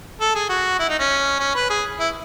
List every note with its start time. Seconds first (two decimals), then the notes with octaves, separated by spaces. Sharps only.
0.21 A4
0.35 G#4
0.49 F#4
0.79 E4
0.89 D#4
0.99 C#4
1.40 C#4
1.55 B4
1.70 G#4
2.00 E4